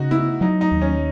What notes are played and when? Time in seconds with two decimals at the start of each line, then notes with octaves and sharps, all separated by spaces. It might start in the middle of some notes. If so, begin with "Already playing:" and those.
Already playing: C#3 D#4 F#4
0.11 B3 E4
0.41 F#3 D#4
0.61 D#4
0.71 D#2
0.82 C#4